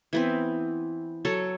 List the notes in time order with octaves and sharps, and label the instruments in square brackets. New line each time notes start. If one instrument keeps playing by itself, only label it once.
[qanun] E3 B3 C4
F#3 A4 C#5